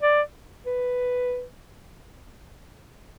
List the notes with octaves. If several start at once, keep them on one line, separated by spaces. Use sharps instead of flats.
D5
B4